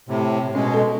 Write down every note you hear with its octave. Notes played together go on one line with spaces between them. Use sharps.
A2 C3
B2 G#3 C#4
A4 D#5